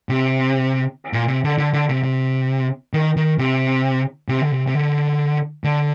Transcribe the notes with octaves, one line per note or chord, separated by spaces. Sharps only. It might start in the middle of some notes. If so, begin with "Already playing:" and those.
C3
A#2
C3
D3
D3
D3
C3
C3
D#3
D#3
C3
C3
D3
C3
C3
D3
D3